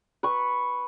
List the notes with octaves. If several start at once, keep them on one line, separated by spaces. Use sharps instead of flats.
B4 C#6